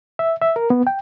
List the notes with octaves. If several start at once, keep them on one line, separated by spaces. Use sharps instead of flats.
E5
E5
A#4
B3
G5